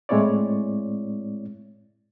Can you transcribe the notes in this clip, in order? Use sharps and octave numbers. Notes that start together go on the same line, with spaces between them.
A2 G#3 C4 E4 C#5 D5